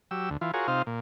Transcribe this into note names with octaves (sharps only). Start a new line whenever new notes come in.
F#3 G4 E6
D2
E3 F4
F4 F#4 G#4 A#4 C#5
C3 D#4 F4 C5 F5
A#2